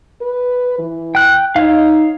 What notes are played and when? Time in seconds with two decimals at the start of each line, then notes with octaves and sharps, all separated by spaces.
0.22 B4
0.79 E3
1.15 G5 F#6
1.56 D#4 C#5 F5